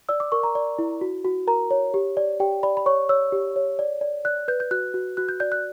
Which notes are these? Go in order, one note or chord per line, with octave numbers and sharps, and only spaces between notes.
D5 E6
D6
A#4 C#6
A#5
D5
E4
F#4
F#4
A#4 A#5
C#5
G4
D5
G4 G5
D5 B5
B5
C#5 C#6
C#5 E6
G4
C#5
D5
D5
D5 F#6
B4 G6
G6
F#4 F#6
F#4
F#4 F#6
G6
D5 G6
F#6